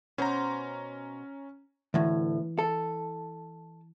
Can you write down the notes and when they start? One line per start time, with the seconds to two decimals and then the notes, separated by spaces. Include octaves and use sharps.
0.18 B2 C#4 C5 A#5
1.94 D2 A2 E3
2.59 A4